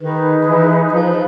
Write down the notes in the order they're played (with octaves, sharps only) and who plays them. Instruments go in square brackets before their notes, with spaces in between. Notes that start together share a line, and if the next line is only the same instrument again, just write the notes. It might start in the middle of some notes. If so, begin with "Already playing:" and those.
[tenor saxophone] D#3 [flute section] D#4 G#4 B4
[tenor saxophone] E3
F3